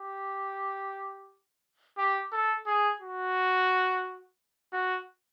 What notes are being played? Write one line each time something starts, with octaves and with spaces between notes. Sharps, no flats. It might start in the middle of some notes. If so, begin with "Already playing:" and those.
Already playing: G4
G4
A4
G#4
F#4
F#4